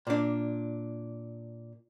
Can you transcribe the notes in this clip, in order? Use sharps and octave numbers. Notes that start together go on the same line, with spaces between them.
A#2 D4